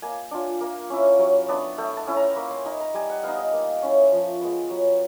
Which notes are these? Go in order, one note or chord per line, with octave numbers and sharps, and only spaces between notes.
A#3 G#5
D4 F4
A#3
C#4 E4
F#3
B3 D4
A3 G5
A5
C#4 E4
A#5
A#3 B5
C6
D#4 B5
A#5
G3 G#5
F#5
B3 D#4 F5
D#5
A#3
C#4 E4
F3
G#3 B3
F#3